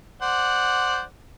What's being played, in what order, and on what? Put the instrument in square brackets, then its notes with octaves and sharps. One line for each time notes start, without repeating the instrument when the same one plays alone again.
[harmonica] C5 D5 F#5